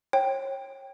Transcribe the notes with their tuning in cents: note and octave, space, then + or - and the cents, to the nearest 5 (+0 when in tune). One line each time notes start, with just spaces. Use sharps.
C#5 -30 G5 -5